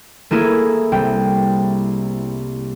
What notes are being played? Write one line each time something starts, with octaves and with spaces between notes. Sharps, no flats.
A3 A#3 E4 G#4
C2 G5